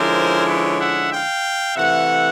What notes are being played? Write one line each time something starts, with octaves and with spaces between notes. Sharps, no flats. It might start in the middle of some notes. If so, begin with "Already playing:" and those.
Already playing: D3 F3 G#3 C#4 E4 A#4 C5
B4 C#5
E5 F#5
F5 G5
C3 E3 A3 E5 F#5